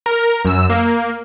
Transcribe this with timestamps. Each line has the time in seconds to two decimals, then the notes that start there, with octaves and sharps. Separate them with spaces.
0.06 A#4
0.45 F#2 E6
0.70 A#3